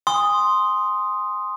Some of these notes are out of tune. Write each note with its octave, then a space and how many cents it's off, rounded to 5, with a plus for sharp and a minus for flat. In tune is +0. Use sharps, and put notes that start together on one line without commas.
G#5 -25 C6 +0 D#6 +0